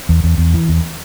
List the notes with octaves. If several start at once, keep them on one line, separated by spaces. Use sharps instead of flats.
E2
E2
E2
E3
E2